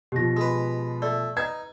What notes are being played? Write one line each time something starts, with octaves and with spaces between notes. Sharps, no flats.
B2 F3 G4 A#6
G#3 B4
A3 D5
D#4 B4 G#6